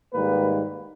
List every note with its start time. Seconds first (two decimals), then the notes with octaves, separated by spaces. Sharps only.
0.13 G#2 D#3 G3 A#3 B4